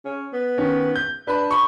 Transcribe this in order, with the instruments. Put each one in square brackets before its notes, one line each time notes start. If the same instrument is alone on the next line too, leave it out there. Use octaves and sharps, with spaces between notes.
[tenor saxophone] C#4
B3
[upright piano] D#3 C#4
G6
[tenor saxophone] D4 [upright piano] B4 B5
[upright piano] B5 C#6